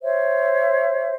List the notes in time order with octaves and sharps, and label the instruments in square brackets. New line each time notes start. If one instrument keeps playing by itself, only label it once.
[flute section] C5 C#5 E5